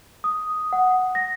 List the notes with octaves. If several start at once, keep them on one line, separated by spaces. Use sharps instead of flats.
D#6
F#5
A#6